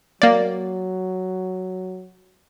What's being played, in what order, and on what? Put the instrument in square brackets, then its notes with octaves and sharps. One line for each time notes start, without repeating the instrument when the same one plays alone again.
[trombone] F#3 [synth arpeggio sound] A#3 D5